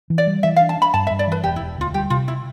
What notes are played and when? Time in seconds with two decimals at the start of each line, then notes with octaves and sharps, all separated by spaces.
0.10 E3
0.18 D5
0.27 G3
0.43 E3 E5
0.56 F5
0.61 D4
0.69 A5
0.77 D4 B5
0.94 G2 A5
1.07 E5
1.11 G2
1.19 D5
1.27 E3 B4
1.44 E1 G4
1.56 E4
1.61 E1
1.77 D2 F4
1.94 G3 G4
2.10 C3 F4
2.28 E4